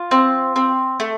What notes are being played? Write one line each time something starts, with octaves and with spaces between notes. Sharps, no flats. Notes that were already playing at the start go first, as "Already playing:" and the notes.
Already playing: F4
C4
C4
A3